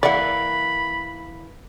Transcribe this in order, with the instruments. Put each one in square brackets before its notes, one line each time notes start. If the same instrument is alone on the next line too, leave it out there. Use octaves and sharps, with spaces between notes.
[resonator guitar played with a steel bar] E3 A#3 [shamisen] D5 F#5 [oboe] B5